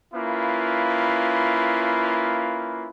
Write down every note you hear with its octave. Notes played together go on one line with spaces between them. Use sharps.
A#3 C#4 E4 F4 B4